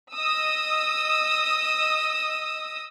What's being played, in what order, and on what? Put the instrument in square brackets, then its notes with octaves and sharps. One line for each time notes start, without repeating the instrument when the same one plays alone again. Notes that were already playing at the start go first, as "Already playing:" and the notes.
[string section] D#5 D#6 E6